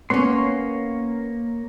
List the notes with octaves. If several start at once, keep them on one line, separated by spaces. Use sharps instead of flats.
A#3 B3 C#4 C#5 C6